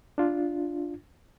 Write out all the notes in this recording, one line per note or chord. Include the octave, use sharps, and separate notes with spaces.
D4 F4